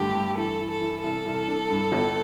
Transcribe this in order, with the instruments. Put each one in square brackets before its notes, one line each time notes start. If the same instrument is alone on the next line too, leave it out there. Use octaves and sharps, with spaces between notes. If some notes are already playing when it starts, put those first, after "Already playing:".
Already playing: [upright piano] G2 D3 A3 [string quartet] G4
[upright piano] G2
[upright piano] E3 [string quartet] A4
[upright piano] E3
[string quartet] A4
[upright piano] E3
[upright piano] C2 [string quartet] A4
[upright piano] C2
D4
G2
G1